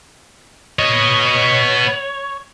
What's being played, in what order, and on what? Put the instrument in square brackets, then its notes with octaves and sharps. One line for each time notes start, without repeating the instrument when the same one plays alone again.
[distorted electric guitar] B3 D#5 [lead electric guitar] C#5